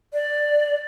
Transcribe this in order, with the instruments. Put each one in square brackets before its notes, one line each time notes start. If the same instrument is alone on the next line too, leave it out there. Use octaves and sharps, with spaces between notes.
[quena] D5